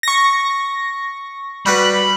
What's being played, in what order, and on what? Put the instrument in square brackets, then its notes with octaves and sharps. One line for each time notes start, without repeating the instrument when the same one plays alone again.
[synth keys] C#6 A#6
[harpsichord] G3 F#4 B4 [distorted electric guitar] B5